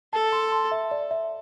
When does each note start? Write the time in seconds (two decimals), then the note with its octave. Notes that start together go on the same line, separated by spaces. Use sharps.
0.13 A4 A5
0.32 C6
0.52 C6
0.71 E5
0.91 D5
1.11 E5